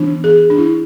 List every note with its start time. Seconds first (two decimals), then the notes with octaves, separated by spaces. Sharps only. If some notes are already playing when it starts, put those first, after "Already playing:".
Already playing: E3 B3 D4
0.24 G#4
0.50 D4
0.58 E4